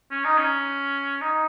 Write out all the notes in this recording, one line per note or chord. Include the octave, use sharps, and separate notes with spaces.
C#4
D#4
C#4
D#4